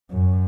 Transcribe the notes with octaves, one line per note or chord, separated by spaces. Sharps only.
F#2